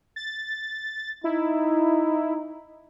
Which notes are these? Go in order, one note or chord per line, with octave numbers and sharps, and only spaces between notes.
A6
D#4 E4